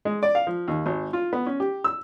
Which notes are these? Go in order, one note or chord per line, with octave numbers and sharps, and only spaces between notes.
G#3
D5
F5
F3
D#2
G#1
F4
B3
C#4
G4
E6